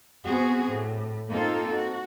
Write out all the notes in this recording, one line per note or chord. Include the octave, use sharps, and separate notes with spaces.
B3 C4 F#4 G#4
A2
A#3 C4 D#4 F4 A4
F#4